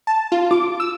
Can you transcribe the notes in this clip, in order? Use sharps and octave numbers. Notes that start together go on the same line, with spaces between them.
A5
F4
D6
E6